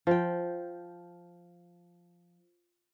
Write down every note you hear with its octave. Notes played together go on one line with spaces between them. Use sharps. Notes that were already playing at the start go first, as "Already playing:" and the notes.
F3 G5